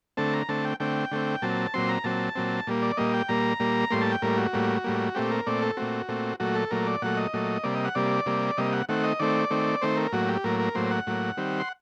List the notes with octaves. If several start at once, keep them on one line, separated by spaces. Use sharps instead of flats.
D3 A3 C4 A5
A#5
D3 A3 C4 A5
G5
D3 A3 C4 G5
D3 A3 C4
A#2 F#3 C4 A5
A#2 F#3 C4 C6
A#5
A#2 F#3 C4 A5
A#2 F#3 C4
A#2 G3 A#3
D5
A#2 G3 A#3 D#5
G5
A#2 G3 A#3 A#5
A#2 G3 A#3
A2 G3 A#3 C6
A5
G5
A2 G3 A#3 A#4
F#4
A2 G3 A#3
A2 G3 A#3
A#2 A3 C4 G4
A#4
A#2 A3 C4 D5
A4
A#2 A3 C4 F#4
A#2 A3 C4
A#2 F#3 A3 F#4
A4
A#2 F#3 A3 A#4
D5
A#2 F#3 A3 F#5
D#5
A#2 F#3 A3
C3 G3 A#3 D5
D#5
F#5
C3 G3 A#3 D5
C3 G3 A#3
C3 G3 A#3 D#5
F#5
D#3 A3 C4 F#5
D#5
D#3 A3 C4 D5
D#3 A3 C4
D#3 A3 C4 C5
A#4
A2 F#3 A#3 F#4
G4
A2 F#3 A#3 A#4
A#4
A2 F#3 A#3 C5
F#5
A2 F#3 A#3
D#3 G3 C4
C6